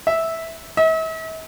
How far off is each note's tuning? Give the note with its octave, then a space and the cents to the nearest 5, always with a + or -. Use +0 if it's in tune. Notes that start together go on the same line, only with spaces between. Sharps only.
E5 -10
E5 -45